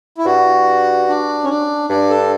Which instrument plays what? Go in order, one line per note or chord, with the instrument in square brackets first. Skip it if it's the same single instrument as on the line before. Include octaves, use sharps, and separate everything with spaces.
[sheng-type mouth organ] E4
[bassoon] G2 [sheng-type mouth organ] F#4
[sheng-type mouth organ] D4
C#4
D4
[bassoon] G2 [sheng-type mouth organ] D4
[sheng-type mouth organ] A4